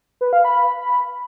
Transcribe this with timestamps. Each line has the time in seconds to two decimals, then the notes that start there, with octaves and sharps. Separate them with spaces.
0.21 B4
0.33 F5
0.45 B5